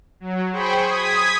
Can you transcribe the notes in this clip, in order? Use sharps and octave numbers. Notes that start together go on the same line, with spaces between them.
F#3
G#4 C5 G5 B5 C#6
D#6 G#6 B6